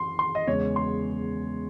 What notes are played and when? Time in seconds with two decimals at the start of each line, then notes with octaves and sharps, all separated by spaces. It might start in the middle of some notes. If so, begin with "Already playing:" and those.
Already playing: F#2 E3 C6
0.19 C6
0.35 D#5
0.47 E2 C#3 G#3 C#5
0.76 C6